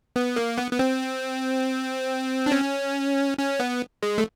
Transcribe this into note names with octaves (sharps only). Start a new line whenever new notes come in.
B3
A#3
B3
B3
C4
D4
C#4
C#4
B3
G#3
A3